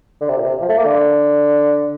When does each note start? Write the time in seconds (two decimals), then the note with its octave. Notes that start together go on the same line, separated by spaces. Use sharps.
0.21 D3
0.29 C3
0.37 A#2
0.45 C3
0.61 F3
0.69 A3
0.77 A#3
0.85 D3